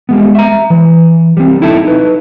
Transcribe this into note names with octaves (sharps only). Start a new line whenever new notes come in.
G3 G#3 B3
E5 A#5
E3
G3 C4
D#4 E4 A4 E5 A5
D#4 B4